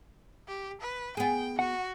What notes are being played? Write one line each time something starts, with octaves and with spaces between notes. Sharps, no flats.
G4
B4
B3 G#4 G5
F#4 F#5